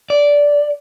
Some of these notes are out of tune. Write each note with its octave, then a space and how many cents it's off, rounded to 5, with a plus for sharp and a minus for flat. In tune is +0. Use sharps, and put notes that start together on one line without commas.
D5 -10